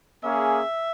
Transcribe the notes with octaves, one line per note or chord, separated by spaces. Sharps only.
A#3 C#4 G#4 E5